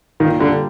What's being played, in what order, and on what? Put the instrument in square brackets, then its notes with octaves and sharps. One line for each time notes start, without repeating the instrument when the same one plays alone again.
[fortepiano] A#2 [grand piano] D#3
[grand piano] D3 [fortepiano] G3